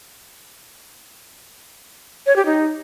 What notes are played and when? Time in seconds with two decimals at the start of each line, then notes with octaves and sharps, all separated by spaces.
2.26 C#5
2.36 G4
2.46 D#4